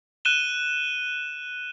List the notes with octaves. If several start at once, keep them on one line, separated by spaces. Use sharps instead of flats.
F#6 D#7 E7 G7